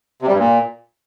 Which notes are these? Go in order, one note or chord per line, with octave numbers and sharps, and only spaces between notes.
C3
G3
G2
A#2